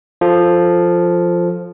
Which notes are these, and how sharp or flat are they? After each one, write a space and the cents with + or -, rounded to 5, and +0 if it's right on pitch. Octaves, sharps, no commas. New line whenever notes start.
F3 +0 A4 +5